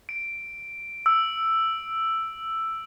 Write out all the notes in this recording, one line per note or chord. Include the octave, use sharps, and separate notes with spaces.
D7
E6